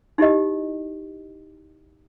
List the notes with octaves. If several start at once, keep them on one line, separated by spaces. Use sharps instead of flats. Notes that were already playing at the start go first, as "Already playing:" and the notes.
D#4 E4 G4 D#5